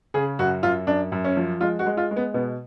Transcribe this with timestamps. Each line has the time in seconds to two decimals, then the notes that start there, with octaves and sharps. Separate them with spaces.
0.14 C#3 G#4
0.39 F#2 F#4
0.63 F#2 F4
0.87 F#2 D4
1.12 F#2
1.24 C#4
1.37 F3
1.61 G#3 F4
1.79 F#4
1.86 G#3
1.97 F4
2.11 G#3
2.16 B3
2.34 B2 B3